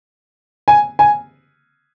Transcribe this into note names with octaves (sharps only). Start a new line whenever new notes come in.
G#5
G#5